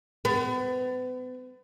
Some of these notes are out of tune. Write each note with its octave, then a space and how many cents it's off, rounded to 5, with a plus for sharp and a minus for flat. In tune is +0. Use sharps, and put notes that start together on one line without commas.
B3 +40